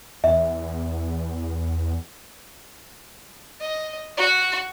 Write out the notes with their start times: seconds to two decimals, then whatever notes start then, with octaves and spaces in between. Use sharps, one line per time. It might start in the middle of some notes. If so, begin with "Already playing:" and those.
0.24 E2 E5
3.60 D#5
4.17 F#4